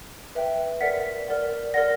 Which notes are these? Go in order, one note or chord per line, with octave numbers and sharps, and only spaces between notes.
B4 E5 G5
A#4 D5 F#5 B6
A#4 D5 F#5
A#4 D5 F#5 A#6